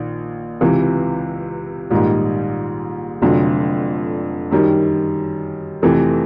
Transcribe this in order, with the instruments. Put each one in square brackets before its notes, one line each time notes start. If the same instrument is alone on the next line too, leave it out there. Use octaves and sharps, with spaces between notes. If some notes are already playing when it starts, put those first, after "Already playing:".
Already playing: [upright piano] A#1 D#3
C#2 C3 E3
A#1 G#2 D#3 G3
F1 F2 D3 F#3
F#2 D#3 G3
F2 C3 E3 A3